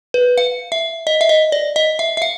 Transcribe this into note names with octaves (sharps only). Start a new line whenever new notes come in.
B4
F5
E5
D#5
E5
D#5
D5
D#5
E5
E5
F5